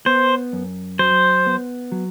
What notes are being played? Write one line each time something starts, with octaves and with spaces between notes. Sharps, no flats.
B3 C5
F#2
F#3 C5
B3
F#3